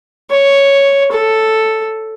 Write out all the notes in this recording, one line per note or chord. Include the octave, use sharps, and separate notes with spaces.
C#5
A4